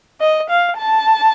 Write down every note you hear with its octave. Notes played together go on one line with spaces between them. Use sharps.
D#5
F5
A5